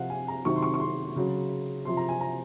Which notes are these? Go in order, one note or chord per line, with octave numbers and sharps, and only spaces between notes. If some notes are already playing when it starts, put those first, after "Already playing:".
Already playing: C3 F3 F5 F#5
G#5
A#5
C3 D#3 F#3 C#6
C6
C#6
C#6
C6
C#3 F#3
C3 F3 C6
A#5
G#5
A#5